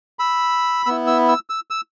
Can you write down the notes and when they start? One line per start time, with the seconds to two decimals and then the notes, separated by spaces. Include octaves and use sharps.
0.19 B5 E6
0.86 B3 E4 E6
1.07 E6
1.29 E6
1.50 E6
1.70 E6